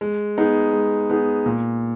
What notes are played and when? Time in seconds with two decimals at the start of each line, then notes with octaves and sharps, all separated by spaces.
0.01 G#3
0.37 B3 D#4 G#4
0.73 G#3
1.10 B3 D#4 G#4
1.46 A#2